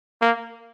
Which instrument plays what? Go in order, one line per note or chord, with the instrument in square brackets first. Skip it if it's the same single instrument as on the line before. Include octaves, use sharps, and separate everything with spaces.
[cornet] A#3